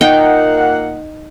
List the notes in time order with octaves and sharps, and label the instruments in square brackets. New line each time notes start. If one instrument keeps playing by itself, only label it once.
[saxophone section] A#2 A#3 F#5 [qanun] D#4 G5